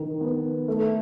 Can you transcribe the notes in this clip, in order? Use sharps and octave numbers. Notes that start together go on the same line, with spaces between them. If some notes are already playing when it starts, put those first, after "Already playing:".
Already playing: D#3
B3
A3